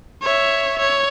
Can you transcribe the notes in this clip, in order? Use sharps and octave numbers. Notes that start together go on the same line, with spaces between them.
C#5 E5
C#5